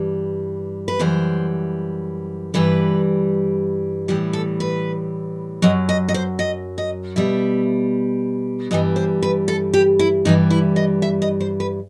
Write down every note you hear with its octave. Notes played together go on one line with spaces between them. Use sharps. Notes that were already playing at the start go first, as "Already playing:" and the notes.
Already playing: G2 E3 G3
B4
F#2 E3 G3 C5
G2 E3 G3 B4
A2 E3 G3 G4
A4
B4
F#2 F#3 D#5
D#5
D#5
C5
D#5
D#5
B2 G3 E5
G2 E3 G3 D#5
C5
B4
A4
G4
E4
G2 E3 G3 D#4
E4
D#5
E5
D#5
C5
B4